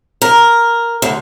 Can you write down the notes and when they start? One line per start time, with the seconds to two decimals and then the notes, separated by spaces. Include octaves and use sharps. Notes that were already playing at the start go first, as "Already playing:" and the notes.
0.22 A#4
1.02 D2